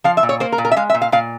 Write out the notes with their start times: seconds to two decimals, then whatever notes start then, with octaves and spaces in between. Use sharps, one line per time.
0.04 F3 F5
0.17 E5
0.23 A#2
0.29 C#5
0.40 A#3 C5
0.52 A#4
0.58 A#2
0.65 A#4
0.71 E5
0.76 G#3 F5
0.90 E5
0.94 A#2
1.02 F5
1.12 A#2 F5